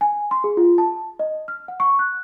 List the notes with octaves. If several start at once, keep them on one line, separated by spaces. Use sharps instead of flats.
G#5
C6
G#4
F4
A5
D#5
F6
F#5
C#6
F#6